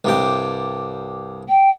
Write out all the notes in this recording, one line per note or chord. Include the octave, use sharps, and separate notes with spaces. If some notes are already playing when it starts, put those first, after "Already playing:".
C2 G2 G4
G5